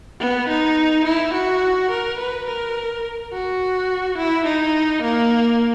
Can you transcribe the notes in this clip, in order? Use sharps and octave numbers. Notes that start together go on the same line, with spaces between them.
B3
D#4
E4
F#4
A#4
B4
A#4
F#4
E4
D#4
A#3